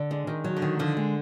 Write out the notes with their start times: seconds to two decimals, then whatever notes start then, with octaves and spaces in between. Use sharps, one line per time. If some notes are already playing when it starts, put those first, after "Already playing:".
Already playing: D3
0.11 G#3 D4
0.27 D#3
0.44 F#3
0.57 D3
0.62 D#3
0.79 D3 F3
0.97 G#3